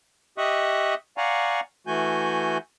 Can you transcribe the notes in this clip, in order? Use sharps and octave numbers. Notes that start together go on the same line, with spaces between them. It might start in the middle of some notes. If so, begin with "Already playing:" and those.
G4 D#5 E5 C#6 D#6 F#6
D5 F5 F#5 G#5 A#5 C#6
E3 A3 F#4 G#5 G6